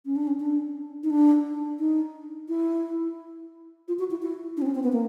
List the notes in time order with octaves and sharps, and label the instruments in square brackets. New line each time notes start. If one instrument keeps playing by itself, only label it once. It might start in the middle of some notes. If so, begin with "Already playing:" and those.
[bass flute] C#4
D4
C#4
D4
D#4
D4
D#4
E4
F4
F#4
E4
E4
D4
C4
C#4
C4
B3
A#3